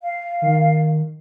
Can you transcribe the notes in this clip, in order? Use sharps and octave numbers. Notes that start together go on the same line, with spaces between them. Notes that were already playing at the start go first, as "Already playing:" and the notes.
F5
D#3